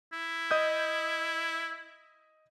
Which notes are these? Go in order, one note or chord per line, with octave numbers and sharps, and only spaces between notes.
E4
D#5 D#6 G6